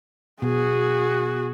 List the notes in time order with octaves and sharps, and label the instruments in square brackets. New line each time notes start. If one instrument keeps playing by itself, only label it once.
[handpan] B2 [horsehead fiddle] F#4 G#4